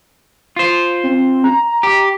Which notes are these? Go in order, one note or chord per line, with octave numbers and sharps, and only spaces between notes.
F4 C5
C4
A#5
G4